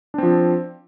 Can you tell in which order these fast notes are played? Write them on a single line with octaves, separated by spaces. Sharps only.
D4 C4 F3